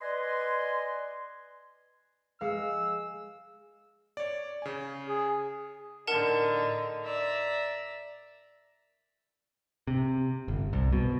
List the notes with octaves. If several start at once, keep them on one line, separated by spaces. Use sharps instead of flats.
B4 D5 D#5 G#5 C6
G#3 G#4 B4 F5 E6
C#5 D5
C#3 G#5
G#4
A2 D3 D#4 A#4 F#5 A5
D5 E5 A#5
C3
G1
C2
B2